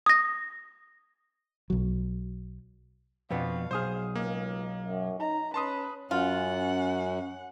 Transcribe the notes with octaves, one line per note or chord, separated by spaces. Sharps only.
D#6 A#6
B1 F#3
F2 B2 B3 C4 D4 F5
B1 G#4 C5 D#6 F6
C#2 A#3 D#5
F#2
D#4 A#5
C#4 B4 A5 C6 D#6
F#2 C#4 F4 F#5